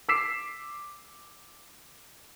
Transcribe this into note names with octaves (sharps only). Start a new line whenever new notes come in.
D6 E6 B6 C7 E7